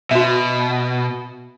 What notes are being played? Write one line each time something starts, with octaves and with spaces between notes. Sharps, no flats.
B2 F#4 E5